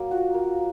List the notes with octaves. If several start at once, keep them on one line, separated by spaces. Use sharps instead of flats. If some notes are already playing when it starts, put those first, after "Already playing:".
Already playing: F#3 A#3
F4 F#4
A#3